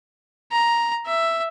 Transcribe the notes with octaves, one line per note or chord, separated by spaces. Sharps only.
A#5
E5